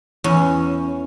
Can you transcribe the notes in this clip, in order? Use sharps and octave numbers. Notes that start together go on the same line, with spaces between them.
E2 C#4